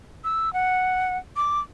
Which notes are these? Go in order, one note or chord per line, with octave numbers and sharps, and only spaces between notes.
E6
F#5
D6